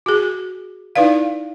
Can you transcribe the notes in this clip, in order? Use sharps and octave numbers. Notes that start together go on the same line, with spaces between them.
F#4 G#4
D#4 E4 B4 D5 F5